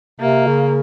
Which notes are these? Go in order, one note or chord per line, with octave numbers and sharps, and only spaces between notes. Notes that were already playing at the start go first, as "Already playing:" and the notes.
C3 A#3
C#3